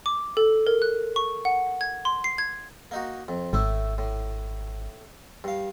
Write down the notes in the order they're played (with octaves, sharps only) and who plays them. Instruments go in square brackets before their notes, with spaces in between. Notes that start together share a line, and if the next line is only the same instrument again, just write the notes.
[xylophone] D6
A4
A#4
F#6
C#6
F#5
G#6
C6
C7
G#6
[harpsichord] A#3 D#4 F#4
F2
[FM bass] G#1 [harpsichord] A2 A3 E4
[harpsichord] A2
G2 F5